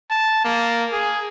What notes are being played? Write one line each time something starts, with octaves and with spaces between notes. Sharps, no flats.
A5
A#3
G#4